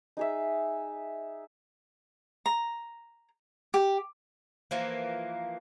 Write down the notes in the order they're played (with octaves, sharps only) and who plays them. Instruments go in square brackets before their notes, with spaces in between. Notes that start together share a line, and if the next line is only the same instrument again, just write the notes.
[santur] D#4 G#4 E5
[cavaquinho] A#5
G4
[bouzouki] E3 F3 A#3